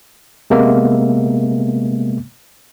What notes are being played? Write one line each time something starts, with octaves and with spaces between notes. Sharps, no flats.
C3 G#3 A#3 B3 E5